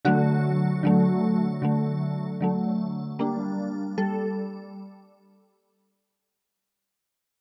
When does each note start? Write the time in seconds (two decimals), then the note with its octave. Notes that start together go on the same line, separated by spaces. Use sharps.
0.05 D3 F#3 A3 F#4
0.83 D3 F#3 A3
1.62 D3 F#3 A3
2.41 D3 F#3 A3
3.19 G3 A#3 D4
3.98 G3 A4